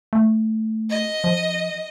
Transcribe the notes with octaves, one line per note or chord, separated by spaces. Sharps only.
A3
D#5
F3